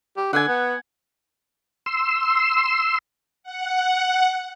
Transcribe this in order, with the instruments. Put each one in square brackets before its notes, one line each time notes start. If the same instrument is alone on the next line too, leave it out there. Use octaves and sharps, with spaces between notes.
[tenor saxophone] G4
[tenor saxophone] D3 [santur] F#5 G#5
[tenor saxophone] B3
[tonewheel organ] C6 E6
[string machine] F#5